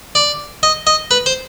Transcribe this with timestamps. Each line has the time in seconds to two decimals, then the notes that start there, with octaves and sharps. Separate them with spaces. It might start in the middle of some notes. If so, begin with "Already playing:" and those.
0.15 D5
0.63 D#5
0.87 D#5
1.11 B4
1.26 C5